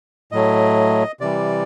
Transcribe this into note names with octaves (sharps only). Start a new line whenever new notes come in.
A2 F#3 A3 D#5
C3 E3 G3 D5